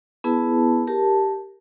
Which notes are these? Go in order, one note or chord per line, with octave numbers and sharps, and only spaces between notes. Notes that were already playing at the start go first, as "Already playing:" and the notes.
B3 E4 G#4 B4 A5
G4 A#4 A5